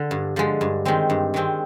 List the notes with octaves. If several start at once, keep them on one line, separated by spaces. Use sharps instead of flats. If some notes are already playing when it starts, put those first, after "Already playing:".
Already playing: D3
G2
D3 F3 G#3
G2
D#3 G#3 C4
G2
D#3 G#3 C4